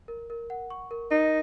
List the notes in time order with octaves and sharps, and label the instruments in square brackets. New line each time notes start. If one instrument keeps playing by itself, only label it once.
[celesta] A#4
A#4
F#5
C#6
A#4
[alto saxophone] D#4 [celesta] A#4